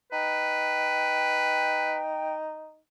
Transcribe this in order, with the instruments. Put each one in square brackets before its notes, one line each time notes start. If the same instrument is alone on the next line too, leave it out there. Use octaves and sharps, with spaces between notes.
[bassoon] D#4 [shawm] B4 [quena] G5